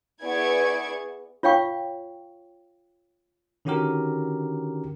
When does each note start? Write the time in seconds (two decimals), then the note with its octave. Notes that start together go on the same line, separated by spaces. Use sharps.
0.24 B3 E4 G#4 D5 C#6 G#6
1.43 F4 C#5 F5 G5 C#6
3.65 D3 D#3 C#4 F#4 G4 A#4